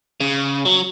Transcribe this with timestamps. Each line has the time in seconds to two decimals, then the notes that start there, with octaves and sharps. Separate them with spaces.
0.20 C#3
0.65 F#3